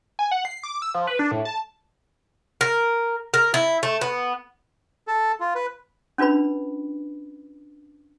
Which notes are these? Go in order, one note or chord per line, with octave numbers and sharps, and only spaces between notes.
G#5
F#5
C7
D6
E6
F3
B4
D4
A2
A5
A#4
A#4
E4
A3
B3
A4
F4
B4
C#4 D4 F4 B4 B5